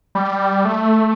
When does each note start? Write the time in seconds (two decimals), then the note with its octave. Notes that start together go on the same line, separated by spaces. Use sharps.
0.15 G3
0.65 A3